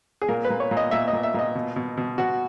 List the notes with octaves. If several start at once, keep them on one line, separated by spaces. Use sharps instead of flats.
G#4
A#2 A#4
B4
A#2
C#5
A#2
D#5
A#2 E5
D#5
A#2
E5
A#2 D#5
B2
B2
B2
B2 F#4